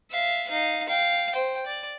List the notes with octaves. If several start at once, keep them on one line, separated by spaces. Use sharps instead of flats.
E5 F5
D#4 F5
F5 G5
C5 G5
D5